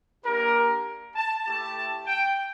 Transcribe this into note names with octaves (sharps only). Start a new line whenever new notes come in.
A#3 D4 G4 A#4
A5
A3 E4 G4 A5
G5